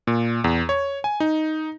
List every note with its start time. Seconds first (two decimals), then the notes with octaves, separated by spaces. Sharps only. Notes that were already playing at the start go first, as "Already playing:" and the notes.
0.07 A#2
0.44 E2
0.69 C#5
1.04 G#5
1.20 D#4